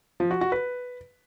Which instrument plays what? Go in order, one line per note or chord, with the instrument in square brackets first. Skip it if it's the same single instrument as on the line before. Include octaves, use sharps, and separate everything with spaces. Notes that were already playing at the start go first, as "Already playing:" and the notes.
[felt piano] F3
F#4
F#4
B4